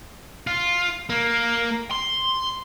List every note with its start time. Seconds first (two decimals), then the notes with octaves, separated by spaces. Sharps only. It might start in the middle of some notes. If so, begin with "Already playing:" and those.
0.47 F4
1.10 A#3
1.91 C6